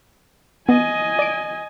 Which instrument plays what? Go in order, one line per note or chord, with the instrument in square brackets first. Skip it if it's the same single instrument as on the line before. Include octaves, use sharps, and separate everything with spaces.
[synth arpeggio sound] B3 [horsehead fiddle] D#5 G#5
[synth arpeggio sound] D5 D7